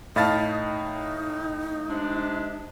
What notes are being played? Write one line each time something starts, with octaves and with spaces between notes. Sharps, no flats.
A2 D#4 D#5 F5 A5 B5 A6
C3 G#3 D4